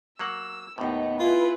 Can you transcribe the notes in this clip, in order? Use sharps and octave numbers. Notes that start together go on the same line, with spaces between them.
F#3 A#3 F#5 E6
D#2 A2 B3 D#4
E4 F4 G#4 B4